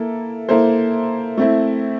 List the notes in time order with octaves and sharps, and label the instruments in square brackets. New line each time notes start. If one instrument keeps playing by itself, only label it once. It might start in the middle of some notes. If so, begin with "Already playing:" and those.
Already playing: [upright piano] A#3 E4 A4
A#3 E4 A4 C5
A3 C4 E4